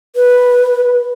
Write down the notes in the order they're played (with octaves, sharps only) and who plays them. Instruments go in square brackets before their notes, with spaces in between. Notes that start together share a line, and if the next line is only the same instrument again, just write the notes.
[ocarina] B4